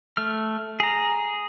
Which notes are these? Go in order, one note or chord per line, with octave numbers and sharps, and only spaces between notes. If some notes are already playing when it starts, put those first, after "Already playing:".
A3 F6
G#4 A#5